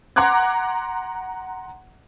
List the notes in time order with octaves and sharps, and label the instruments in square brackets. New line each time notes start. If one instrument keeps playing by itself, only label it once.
[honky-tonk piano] F#5 A#5 C6 D6 F#6 G#6